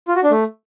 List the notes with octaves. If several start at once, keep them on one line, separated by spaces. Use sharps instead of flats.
F4
F#4
D4
A3